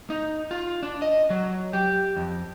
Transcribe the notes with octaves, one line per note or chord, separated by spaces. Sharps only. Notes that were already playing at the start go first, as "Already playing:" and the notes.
D#4
F4
D4
D#5
F#3
G4
F2